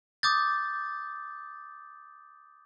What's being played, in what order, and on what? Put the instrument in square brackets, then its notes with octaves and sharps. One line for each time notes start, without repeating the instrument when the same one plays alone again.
[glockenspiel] D6 D#6 G6 A6